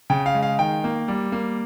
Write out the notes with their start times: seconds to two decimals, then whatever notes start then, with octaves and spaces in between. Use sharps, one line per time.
0.10 C#3 G5
0.26 F5
0.35 G#3
0.42 F5
0.59 D#3 G5
0.84 A#3
1.08 G3
1.32 A#3